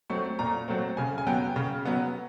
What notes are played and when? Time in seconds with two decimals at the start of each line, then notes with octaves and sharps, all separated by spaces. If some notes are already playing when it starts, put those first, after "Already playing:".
0.10 F#3 A3 C4 C#6
0.39 A#2 A#5
0.68 F#3 A3 C4
0.97 C#3 G#5
1.18 G#5
1.27 F#3 B3 G5
1.56 C#3
1.85 F#3 B3